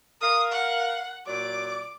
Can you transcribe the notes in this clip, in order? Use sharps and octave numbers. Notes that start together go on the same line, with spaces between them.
A#4 F5 D#6
F#5
A#2 F#3 D5 D6